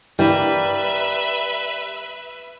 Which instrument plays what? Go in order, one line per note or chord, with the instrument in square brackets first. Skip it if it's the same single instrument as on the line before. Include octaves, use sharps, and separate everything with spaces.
[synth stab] G2 E3 [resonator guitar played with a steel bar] G3 A#3 [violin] B4 E5